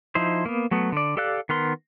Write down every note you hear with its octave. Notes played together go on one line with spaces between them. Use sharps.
F3 D#4 E4 C5
A#3 B3
F#3 A3 B3
D3 D5
G4 A4 D5 F5 F#6
D#3 B3 A#4 C6